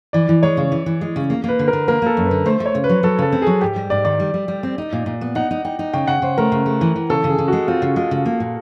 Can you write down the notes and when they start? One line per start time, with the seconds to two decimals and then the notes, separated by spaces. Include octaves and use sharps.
0.13 E3 D5
0.29 E3
0.43 G#3 C#5
0.57 C#3
0.72 E3
0.86 E3
1.01 G#3
1.16 C#3
1.30 A#3
1.44 A#3 B4
1.59 D3
1.68 A#4
1.73 D3
1.88 A#3 A#4
2.02 A#3 A4
2.17 F#2
2.26 B4
2.31 D3
2.46 A3 C5
2.60 A3
2.66 C#5
2.75 C#3
2.84 B4
2.89 F#3
3.03 F#3 A4
3.19 C#3 A4
3.32 C4
3.42 F#3 G#4
3.61 G#2 G4
3.76 G3
3.90 G#2 D5
4.05 D#3 D5
4.20 G3
4.34 G3
4.48 G3
4.63 C4
4.78 D#4
4.93 A#2
5.06 A#2
5.21 B3
5.35 D#4 F#5
5.51 D#4
5.65 D#4 G5
5.79 D#4
5.93 C#3 G5
6.07 C#3 F#5
6.22 C#3 C5
6.38 A3 A#4
6.52 C#3
6.66 A3
6.81 E3
6.96 E3
7.10 C#3 A4
7.24 C#3
7.29 G#4
7.38 C#3
7.48 G#3 F#4
7.67 C4 F4
7.82 C#3
7.96 G#3 F4
8.11 C#3
8.25 A#3
8.40 A#2